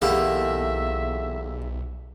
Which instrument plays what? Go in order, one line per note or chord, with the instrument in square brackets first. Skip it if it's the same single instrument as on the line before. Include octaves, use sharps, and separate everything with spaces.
[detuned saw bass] B1 [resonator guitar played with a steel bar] E2 A#3 [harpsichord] G#3 G4 A4 [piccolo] E5